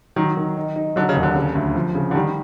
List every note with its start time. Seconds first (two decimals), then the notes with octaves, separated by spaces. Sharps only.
0.16 D#3 F#3
0.37 D#3
0.57 D#4
0.76 D#4
0.96 D3 F#3
1.09 C#3
1.16 D#2
1.23 D3
1.36 C#3
1.55 D2
1.76 F3
1.95 C#3
2.11 D3
2.15 D#3 G3